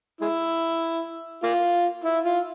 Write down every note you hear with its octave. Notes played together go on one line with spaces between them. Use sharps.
G#3 E4
A#3 F4
E4
F4